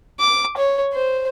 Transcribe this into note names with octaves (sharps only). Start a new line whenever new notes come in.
D6
C#5
C5